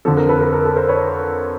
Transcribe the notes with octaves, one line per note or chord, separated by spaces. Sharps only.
F2 D3 A4
A#4
A4 B4
A#4
A#4
A4
A#4 C5
B4 C#5